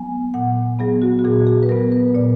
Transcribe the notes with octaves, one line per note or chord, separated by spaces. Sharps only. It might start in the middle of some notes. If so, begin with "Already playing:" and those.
Already playing: F#3 B3 G#5
A#2 F#5
F#3 B3 G#4
F#4
F#4
A#2 G#4
G#4
B4
F#3 B3 A#4
B4
A#2 D5